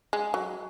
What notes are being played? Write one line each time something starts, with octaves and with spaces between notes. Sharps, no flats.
G#3
F#3